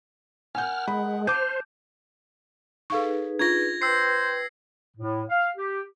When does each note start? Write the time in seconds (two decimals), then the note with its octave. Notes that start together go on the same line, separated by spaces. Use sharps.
0.55 A#4 F#5 G#5 F6 G6
0.88 G#3 B5
1.27 C5 A5 D6 F6 G6 D#7
2.90 D#4 G#4 A4 B4 F5 C#6
3.39 D4 F4 G#6 A#6
3.82 B4 C5 G5 E6 C7
4.96 A2
5.30 F5
5.56 G4